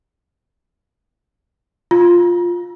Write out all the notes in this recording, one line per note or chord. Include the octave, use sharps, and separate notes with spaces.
F4